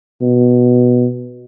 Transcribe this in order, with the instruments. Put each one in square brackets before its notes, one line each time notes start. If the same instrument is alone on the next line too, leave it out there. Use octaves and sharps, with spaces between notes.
[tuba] B2